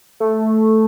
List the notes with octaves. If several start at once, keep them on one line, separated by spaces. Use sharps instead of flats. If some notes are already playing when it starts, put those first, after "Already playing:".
A3